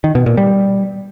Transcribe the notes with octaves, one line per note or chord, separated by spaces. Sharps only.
D#3
B2
A#2
G3